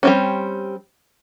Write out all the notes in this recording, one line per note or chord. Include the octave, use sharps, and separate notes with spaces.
G3 C4 C#4